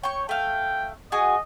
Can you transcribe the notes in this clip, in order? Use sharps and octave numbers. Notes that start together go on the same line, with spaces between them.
C#5 G5 C#6
A3 F5 G5
F#4 G#4 D#5 G#5